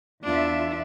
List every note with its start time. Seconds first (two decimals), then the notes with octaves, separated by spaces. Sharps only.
0.24 E2 D4 F4 E5